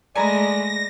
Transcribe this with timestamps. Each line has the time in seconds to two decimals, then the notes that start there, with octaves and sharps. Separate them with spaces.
0.15 G#3 A3 D5 G#5 A#5 B5 A#6